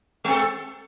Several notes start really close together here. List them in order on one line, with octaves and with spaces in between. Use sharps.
G#3 C4 A4